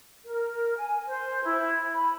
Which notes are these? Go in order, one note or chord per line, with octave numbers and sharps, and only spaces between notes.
A#4
G#5
C5
E4
B5